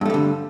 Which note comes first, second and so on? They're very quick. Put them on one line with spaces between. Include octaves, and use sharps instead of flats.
G2 A3 G3 D3